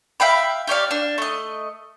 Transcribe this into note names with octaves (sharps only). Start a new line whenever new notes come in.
E5 F5 G5 B5
G4 C#5 D5 F5
D4
A3 D#5